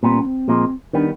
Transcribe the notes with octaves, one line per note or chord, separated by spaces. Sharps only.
A#2 G3 B3 C4
C#4
C4
A#2 F3 G#3
D#3 G3 B3 D4